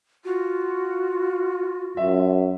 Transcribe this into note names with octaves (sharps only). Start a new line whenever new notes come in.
F4 F#4
F#2 E5